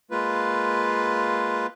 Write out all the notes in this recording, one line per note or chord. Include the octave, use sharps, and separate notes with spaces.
G#3 A#3 F4 B4